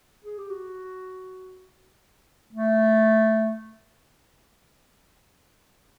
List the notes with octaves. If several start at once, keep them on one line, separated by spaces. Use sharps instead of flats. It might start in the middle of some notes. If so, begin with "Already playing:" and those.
G#4
G4
F#4
A3